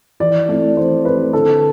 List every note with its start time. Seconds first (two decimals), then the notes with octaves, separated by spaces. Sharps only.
0.20 E3 D5
0.48 A3 C4 E4
0.77 E3 C5
1.05 A3 C4 E4 B4
1.33 D3 A4